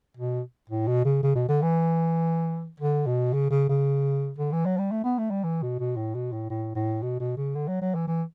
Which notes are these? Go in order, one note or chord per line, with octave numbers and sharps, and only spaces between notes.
B2
A2
B2
C#3
C#3
B2
D3
E3
D3
B2
C#3
C#3
C#3
D3
E3
F#3
G3
A3
B3
A3
G3
E3
B2
B2
A2
B2
A2
A2
A2
B2
B2
C#3
D3
F#3
F#3
E3
E3